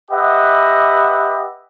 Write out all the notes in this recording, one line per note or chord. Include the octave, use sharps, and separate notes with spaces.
G4 B4 D#5 E5 F#5